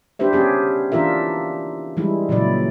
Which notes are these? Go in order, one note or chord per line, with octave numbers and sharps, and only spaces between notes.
D4 G4 B4 C5 E5
B3 C#4 G4 G#4
E3 D4 F4 A#4 E5
E3 G3 G#3 E4
A#2 C#3 E3 F#3 E4 D5